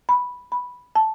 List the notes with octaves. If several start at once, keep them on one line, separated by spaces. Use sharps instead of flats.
B5
B5
A5